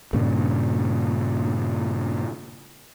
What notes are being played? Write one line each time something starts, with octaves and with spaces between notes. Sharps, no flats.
G2 A#2 C#3